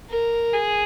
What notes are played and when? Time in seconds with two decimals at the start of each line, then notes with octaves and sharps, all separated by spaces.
0.10 A#4
0.53 G#4